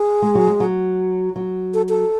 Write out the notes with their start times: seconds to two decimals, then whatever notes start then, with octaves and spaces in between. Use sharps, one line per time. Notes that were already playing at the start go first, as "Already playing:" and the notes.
Already playing: G#4
0.22 G#3
0.35 F#3
0.47 G#3
0.60 F#3
1.36 F#3
1.74 A4
1.89 A4